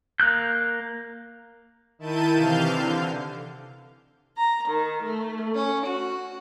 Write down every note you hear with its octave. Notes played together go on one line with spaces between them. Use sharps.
A#3 F#6 G6
D#3 E4 A5 G6 D#7
C3 E3 F5 F6 G6
D3
A#5
D#3
A3
C#4
F#4